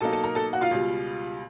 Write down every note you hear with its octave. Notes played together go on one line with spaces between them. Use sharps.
B2 F#3 A#3 D#4 A4 A5
A4 A5
A#4 A#5
A4 A5
F#4 F#5
F4 F5
C#2 B2 G3